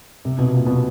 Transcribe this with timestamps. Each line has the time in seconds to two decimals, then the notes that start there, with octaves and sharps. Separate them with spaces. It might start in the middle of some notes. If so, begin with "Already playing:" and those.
0.25 C3
0.38 B2
0.54 A#2
0.66 B2